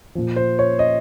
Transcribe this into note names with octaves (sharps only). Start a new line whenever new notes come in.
A#2 F3
C5
C#5
D#5